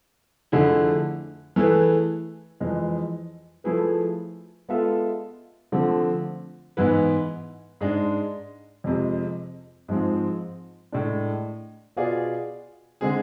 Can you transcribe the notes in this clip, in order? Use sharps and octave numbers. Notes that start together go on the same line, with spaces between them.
F2 D3 A3 E4 G#4
E3 A3 E4 G#4 B4
F2 E3 G#3
F3 A3 E4 G#4 B4
G#3 B3 F4 A4 E5
D3 F3 A3 C4
G#2 E3 B3 E4 B4
G#2 G#3 D4
F2 C3 G#3
G#2 F3 G#3 C4
A2 G#3 D4
B2 B3 F4 G#4 D5
D3 G#3 C4 G#4